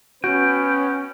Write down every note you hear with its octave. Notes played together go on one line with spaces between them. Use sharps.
B3 C#4 F#4 B4 G5